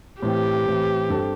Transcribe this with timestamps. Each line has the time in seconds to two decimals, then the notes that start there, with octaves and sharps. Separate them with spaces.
0.22 A2 E3 C4 G4
0.66 A2 E3 C4
1.09 G2 G3 C4 A4 C5